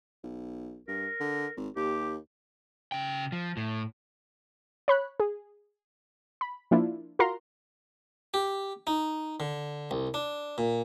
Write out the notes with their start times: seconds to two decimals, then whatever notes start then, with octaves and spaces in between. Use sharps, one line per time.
0.23 B1
0.88 G2 A#4
1.20 D3
1.57 G#1
1.76 D#2 G4
2.92 C#3 G5
3.32 F3
3.57 A2
4.88 C#5 B5 F#6
5.20 G#4
6.41 B5
6.71 F3 A#3 D4 E4 F4
7.19 F4 F#4 A#4 A#5 C6
8.34 G4
8.87 D#4
9.40 D3
9.91 C2
10.14 D4
10.58 A#2